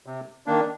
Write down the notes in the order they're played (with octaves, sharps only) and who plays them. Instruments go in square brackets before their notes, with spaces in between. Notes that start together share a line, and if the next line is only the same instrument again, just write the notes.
[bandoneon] C3
D#3 A#3 D4